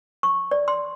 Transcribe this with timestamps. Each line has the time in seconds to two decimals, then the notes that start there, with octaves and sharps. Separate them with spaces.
0.23 C#6
0.51 D5
0.68 C6